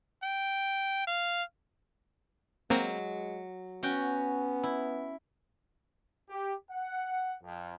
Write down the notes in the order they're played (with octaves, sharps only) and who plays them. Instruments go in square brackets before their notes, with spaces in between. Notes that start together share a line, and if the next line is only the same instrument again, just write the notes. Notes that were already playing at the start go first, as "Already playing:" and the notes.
[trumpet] G5
F5
[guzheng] F#3 [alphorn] G#3 [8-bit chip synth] A#3 C4 A#4
[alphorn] B3 [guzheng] C#4 F#4 G5
[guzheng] E4
[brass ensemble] G4
F#5
F2